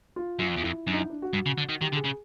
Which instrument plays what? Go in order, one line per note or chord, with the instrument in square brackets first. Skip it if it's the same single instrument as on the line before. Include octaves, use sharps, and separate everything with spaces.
[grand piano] F4
[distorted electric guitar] F#2 [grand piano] F4
[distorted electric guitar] F2
E2
[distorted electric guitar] F2 [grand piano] E4
[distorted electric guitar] F#2 [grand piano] D4
[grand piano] D#4
E4
D4
F#4
[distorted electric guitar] G2
C#3
D3
D#3
[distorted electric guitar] D#3 [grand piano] G4
[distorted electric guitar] D3
[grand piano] G#4
[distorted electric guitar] C#3